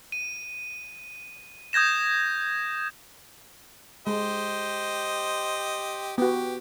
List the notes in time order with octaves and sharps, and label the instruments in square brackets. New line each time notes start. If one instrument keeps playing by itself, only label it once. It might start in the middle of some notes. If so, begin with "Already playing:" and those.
[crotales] D#7
D#6 G6 G#6 A#6 E7
[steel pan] G#3 [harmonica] G4 C5 D#5
[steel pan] B3 F#4 [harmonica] G4